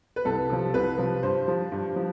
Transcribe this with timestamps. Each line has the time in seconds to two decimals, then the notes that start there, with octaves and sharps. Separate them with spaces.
0.16 B4
0.25 C2 A4
0.50 C3 F3
0.74 C2 B4
0.98 C3 F3
1.23 G2 C5
1.48 F3
1.72 G2
1.96 F3